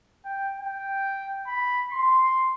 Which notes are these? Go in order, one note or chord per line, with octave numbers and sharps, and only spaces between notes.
G5
G5
B5
C6